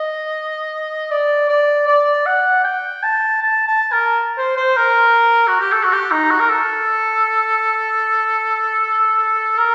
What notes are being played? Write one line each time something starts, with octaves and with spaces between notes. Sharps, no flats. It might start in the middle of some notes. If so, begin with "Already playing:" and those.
Already playing: D#5
D5
D5
D5
F#5
G5
A5
A5
A5
A#4
C5
C5
A#4
F#4
G4
A4
F#4
G4
D#4
F#4
A#4
A4
A#4